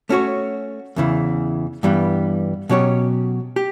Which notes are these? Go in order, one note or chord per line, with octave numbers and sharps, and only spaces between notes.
A3 C#4 F#4 C#5
E2 C#3 E3
G2 E3 G3 B3
B2 F#3 C#4 G4 C#5
G4